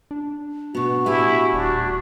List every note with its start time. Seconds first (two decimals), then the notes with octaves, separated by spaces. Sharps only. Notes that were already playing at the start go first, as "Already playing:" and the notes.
0.11 D4
0.75 B2 B3 F#4
1.06 A2 E4 G4 G#5
1.53 D#1 D4